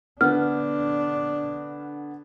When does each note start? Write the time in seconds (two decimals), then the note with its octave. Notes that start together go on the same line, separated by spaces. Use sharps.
0.21 D3 B3 D4 F6